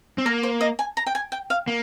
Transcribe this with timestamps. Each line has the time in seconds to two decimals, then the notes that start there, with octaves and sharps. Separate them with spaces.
0.18 C4
0.25 A#3 A#4
0.43 C5
0.61 D#5
0.79 G#5
0.97 A#5
1.07 G5
1.15 G#5
1.32 G5
1.50 F5
1.68 A#3